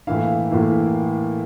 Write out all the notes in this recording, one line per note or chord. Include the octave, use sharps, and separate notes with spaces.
A2 E3 A#3 E4 F5
A2 E3 A#3 E4